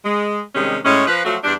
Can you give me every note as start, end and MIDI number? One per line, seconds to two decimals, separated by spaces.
0.04 0.40 56
0.54 0.78 48
0.54 0.78 51
0.54 0.78 55
0.54 0.78 56
0.54 0.78 61
0.84 1.05 45
0.84 1.05 56
0.84 1.05 61
1.07 1.21 53
1.07 1.21 71
1.25 1.37 53
1.25 1.37 54
1.25 1.37 57
1.25 1.37 65
1.25 1.37 66
1.43 1.53 40
1.43 1.53 55
1.43 1.53 62